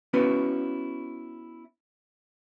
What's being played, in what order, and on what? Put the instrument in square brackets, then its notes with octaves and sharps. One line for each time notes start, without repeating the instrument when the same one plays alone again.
[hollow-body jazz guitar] B3 C#4 E4 F#4 B4